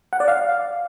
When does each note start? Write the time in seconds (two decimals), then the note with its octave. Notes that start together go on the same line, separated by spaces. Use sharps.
0.13 F#5
0.20 D5
0.28 F5